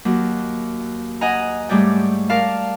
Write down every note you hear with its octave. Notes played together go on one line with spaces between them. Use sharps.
D#2 F#3
D#5 F#5 G#5 A#5
G#2 G3 A3 C#5 D5 G5
A#4 D5 F5 A5